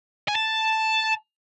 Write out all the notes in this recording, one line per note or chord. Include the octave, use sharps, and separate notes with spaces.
G#5
A5